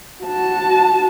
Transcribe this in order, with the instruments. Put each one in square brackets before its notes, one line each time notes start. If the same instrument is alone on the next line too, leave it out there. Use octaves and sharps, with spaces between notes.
[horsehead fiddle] F#4 A5